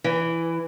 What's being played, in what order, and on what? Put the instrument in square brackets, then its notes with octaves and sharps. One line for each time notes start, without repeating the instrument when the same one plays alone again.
[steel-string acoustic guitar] E3